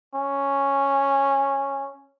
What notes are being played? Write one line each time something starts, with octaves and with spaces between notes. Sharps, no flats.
C#4